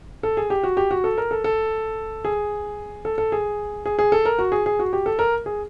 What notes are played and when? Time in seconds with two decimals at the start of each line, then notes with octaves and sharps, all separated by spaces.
0.23 A4
0.37 G#4
0.50 G4
0.63 F#4
0.77 G4
0.91 F#4
1.04 A4
1.18 A#4
1.31 A4
1.44 A4
2.25 G#4
3.05 A4
3.18 A4
3.32 G#4
3.86 G#4
3.99 G#4
4.12 A4
4.25 A#4
4.39 F#4
4.52 G#4
4.66 G#4
4.79 F#4
4.93 G4
5.06 A4
5.19 A#4
5.46 G#4